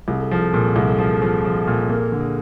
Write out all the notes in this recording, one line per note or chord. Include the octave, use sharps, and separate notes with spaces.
C2 G#4
A4
F3 G#4
A4
A#2 G#4
A4
C2 G#4
A4
F3 G#4
A4
F3 G#4
A4
F3 G#4
A4
A#2 G#4
A#3 A4
D3
G#4